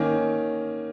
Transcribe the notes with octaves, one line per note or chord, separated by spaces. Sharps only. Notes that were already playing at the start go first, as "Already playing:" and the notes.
Already playing: D#3 A#3 C#4